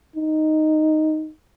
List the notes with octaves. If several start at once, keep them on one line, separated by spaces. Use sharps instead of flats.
D#4